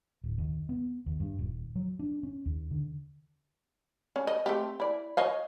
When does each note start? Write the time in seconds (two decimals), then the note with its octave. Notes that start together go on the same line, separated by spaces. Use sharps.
0.24 D1
0.38 D#2
0.69 B3
1.06 D#2
1.20 G2
1.39 D#1
1.75 F#3
1.99 D4
2.23 C#4
2.46 D#2
2.71 D3
4.16 C#4
4.27 D#5
4.46 A3 C4 G4
4.80 E4 D5
5.17 C#5 D#5 F5